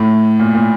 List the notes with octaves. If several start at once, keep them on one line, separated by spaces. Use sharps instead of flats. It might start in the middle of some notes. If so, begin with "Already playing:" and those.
Already playing: A2
A#2
A#2